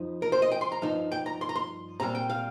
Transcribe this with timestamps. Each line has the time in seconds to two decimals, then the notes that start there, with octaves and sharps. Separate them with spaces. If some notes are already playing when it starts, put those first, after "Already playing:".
Already playing: F2 F3 D#4
0.22 A#4
0.32 C5
0.42 D#5
0.51 G5
0.61 C6
0.72 A#5
0.82 G2 F3 D#4
1.12 G5
1.26 A#5
1.41 C6
1.49 A#5
1.56 C6
2.00 A#2 G3 C4 A#5
2.15 G5
2.30 F5